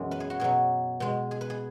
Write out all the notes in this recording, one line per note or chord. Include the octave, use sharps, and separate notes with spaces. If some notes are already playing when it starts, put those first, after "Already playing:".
Already playing: F#2 B2 E3 G#3 C#4
B4
G#4
F#4
B2 F#3 G#4
B2 G#3
G#4
B4
G#4